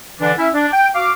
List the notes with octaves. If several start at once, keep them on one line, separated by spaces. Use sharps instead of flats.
D3 E3 D4
C#4 E4 E5
D4
G5
F#4 F5 D6